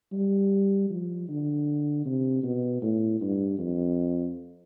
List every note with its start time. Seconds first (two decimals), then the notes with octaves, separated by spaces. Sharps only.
0.12 G3
0.90 F3
1.29 D3
2.06 C3
2.43 B2
2.82 A2
3.21 G2
3.59 F2